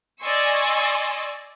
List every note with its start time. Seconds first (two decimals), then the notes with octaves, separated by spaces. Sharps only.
0.21 D5 D#5 G#5 C6 C#6 E6